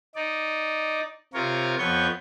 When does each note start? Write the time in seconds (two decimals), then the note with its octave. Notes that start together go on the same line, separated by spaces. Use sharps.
0.15 D#4 D5
1.34 C3 F4 A#4 C#5
1.79 F2 B3 C#5 C#6 G6